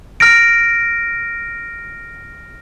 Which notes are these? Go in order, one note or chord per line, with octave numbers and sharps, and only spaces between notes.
F6 A#6 D7